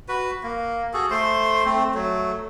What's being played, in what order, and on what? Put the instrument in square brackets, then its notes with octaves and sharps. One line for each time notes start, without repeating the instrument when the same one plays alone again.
[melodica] F#4 B4
A#3
F#4 G#4 A4
A3 C5 C6
A3 C4
F#3 A3